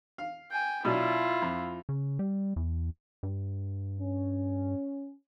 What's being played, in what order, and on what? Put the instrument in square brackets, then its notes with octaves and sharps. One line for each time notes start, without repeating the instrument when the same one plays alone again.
[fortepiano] F5
[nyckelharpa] G5 G#5
[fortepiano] B2 F#3 D4 [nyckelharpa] E4 F4
[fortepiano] F2
[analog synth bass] C#3
G3
E2
G2
[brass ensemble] C#4